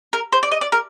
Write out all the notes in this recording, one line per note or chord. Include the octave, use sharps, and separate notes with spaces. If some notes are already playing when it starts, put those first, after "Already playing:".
A#4
C5
D5
D#5
D5
A#4